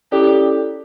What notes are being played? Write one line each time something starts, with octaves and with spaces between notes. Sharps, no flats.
C#4 E4 G4 A4 D5